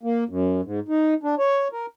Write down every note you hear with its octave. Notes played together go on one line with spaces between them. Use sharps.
A#3
F#2
G#2
D#4
D4
C#5
A#4